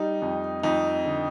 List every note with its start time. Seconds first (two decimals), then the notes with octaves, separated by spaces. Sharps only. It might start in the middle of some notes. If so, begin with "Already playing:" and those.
Already playing: G3 D#4
0.22 F2
0.63 F2 D#4
1.05 D3